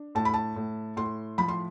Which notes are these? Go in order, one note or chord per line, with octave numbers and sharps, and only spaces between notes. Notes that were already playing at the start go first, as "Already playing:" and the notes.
Already playing: D4
A2 A5
B5
A5
A2
A2 C6
F3 B5
C6